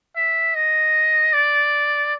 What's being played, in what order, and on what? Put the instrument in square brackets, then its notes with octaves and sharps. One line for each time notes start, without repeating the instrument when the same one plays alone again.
[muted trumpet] E5
D#5
D5